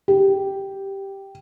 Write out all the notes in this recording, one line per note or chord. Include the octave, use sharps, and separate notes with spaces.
G4